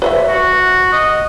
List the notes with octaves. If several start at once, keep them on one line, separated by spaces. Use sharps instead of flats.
B4 C5 E5
F#4
D#5